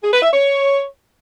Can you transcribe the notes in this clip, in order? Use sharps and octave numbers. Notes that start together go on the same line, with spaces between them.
G#4
B4
E5
C#5